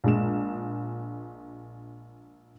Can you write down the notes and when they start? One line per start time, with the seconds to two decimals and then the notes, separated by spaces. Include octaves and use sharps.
0.04 A#1 G#3 E7